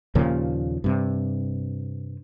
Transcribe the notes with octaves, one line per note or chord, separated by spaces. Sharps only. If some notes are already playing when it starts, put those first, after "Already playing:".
D#2 A#2 C#3 F3
G2 C3